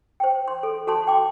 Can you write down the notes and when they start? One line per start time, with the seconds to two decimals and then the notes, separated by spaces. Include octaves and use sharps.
0.20 C5 G5
0.48 C6
0.63 A4
0.87 F#4 A4 A5 C6
1.07 G5 D6